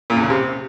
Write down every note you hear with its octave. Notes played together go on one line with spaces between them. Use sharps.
A#2
E2
C#3
C3